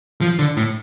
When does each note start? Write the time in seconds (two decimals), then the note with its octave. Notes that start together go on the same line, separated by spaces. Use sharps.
0.21 F3
0.39 D3
0.57 A2